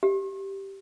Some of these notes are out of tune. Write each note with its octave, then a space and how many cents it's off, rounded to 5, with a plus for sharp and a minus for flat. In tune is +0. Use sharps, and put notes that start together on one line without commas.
G4 -5